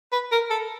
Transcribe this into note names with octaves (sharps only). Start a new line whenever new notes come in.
B4
A#4
A4